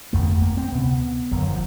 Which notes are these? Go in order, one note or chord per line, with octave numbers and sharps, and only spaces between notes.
G1 F2 C#3 A3
A#3
C4
D2 C3 B3
F#1 F#2 D3 F#3
F3